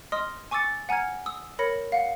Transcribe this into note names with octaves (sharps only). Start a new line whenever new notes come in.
D#5 C6 D#6 F6
G#5 C#6 D6 E6 A6 C#7
F#5 G#5 A#5 F6 G#6
D#6 E6
A#4 C#5 B5 A#6 C#7
F5 F#5